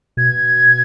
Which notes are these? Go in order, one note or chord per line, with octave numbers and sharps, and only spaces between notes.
B2 G#6